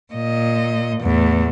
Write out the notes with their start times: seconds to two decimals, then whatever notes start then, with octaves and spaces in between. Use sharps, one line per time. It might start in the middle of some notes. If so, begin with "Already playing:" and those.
0.14 A#2 D#5
1.01 E2 A2